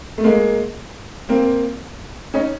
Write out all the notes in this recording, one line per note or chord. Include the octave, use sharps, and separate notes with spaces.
A3
G#3 A#3
A#3 C4
C#4 D#4